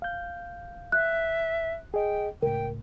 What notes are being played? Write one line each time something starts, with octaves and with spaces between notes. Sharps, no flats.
F5 G6
E5 F#6
G#4 D#5 G5
C#2 A2 A#4 G5